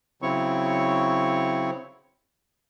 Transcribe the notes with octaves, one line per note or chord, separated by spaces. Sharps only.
C#3 F#3 C4 E4 C#5 C#6